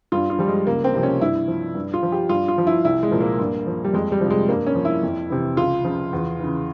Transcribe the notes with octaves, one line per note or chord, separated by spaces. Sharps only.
G2 F4
F4
F3 G3
G#3
C#2 A#3
C4
C3 F3
C#4
G2 E4
F3
G2
F4
F3
G4
G2 F4
F4
F3
E4
C2 E4
G#3
A#2 F3
A#3
G2
F3
G3
F2 G#3
G3
C3 F3
G#3
G2 A#3
C#4
F3
E4
F2
C3 E3
C#2 F4
C#3 F3
E2
C#3 E3